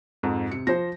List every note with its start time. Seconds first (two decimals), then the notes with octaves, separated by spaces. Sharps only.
0.23 F2 G#2
0.51 C3 C#7
0.67 F3 C5 A#6